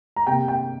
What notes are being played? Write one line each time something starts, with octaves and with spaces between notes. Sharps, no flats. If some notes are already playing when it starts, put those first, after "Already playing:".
A#5
C3 A#3 G5
G5